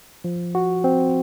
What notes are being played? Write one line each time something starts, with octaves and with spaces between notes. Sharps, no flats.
F3
F#4
C4